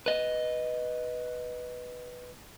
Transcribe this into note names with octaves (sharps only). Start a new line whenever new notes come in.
B4 D#5